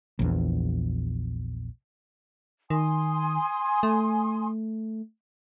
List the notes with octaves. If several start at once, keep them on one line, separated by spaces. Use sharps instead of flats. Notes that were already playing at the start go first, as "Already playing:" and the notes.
A#1 E2
D#3 G#5 C6 D#6
A3